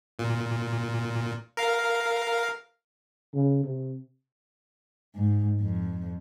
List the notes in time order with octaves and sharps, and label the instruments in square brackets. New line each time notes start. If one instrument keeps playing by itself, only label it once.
[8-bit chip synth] A#2
A#4 F5
[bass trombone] C#3
C3
[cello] G#2
F2